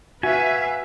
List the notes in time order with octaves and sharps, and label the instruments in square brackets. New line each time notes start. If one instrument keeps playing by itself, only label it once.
[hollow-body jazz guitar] F#4 [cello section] B4 E5 F5 [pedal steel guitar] G#5